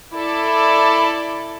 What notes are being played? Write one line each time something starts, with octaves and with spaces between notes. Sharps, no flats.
E4 A4 D5